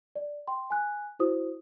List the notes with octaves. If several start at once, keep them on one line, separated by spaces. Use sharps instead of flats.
D5
G5 C6
G#5 F#6
E4 F#4 C5 D#6